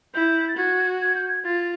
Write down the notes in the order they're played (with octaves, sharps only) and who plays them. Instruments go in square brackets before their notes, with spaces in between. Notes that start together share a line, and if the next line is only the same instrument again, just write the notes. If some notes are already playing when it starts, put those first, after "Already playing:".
[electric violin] E4 [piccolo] G6
[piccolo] A6
[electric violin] F#4 [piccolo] G#6
[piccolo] G#6
G6
G#6
[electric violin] F4 [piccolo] A6